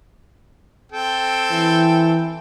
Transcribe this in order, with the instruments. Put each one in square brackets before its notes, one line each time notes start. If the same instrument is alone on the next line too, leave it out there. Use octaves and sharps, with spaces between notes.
[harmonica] C4 A4 G5
[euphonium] E3